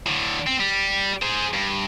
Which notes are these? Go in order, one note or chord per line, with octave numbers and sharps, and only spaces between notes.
A2 D3
C4
G3
G#4 C5
G2